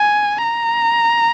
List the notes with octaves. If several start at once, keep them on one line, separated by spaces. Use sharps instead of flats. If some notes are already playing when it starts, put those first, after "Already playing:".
Already playing: G#5
A#5